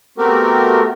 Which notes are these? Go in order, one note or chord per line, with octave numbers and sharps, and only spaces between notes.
A3 B3 C4 F#4 G4 A#4